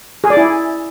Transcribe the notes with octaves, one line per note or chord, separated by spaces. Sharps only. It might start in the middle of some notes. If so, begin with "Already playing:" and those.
G#4
D5
E4